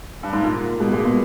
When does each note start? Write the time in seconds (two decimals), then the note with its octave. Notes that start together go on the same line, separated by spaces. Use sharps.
0.23 G2
0.33 G#2
0.43 A#2 A#3
0.80 B2 G#3
0.88 G3
0.92 A#2 G#3
1.04 A#2 B3